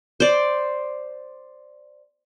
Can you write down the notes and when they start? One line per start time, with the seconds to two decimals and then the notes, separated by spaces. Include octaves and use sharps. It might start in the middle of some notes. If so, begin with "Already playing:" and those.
0.20 C5 D5